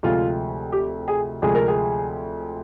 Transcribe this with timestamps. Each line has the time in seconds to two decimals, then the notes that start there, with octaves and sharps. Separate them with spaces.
0.03 D2 C3 F3 G#3 F4
0.72 G4
1.08 G#4
1.42 D2 C3 F3 G#3 G#4
1.55 A#4
1.68 G#4